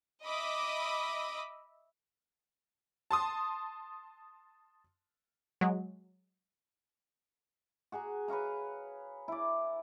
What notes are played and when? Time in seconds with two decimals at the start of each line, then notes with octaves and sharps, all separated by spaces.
0.24 D#5 E5 B5 D6 D#6
3.11 A5 C6 D#6
5.61 F#3 G#3
7.92 F#4 G#4 G#5 A#5
8.28 B4 C#5 F5 A#5
9.28 E4 D5